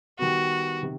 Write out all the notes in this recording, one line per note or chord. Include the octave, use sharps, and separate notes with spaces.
D#3 G3 B3 F#4
C3 D#3